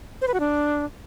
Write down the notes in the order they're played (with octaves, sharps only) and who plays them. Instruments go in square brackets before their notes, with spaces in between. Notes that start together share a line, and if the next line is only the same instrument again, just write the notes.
[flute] C5
B4
F#4
D4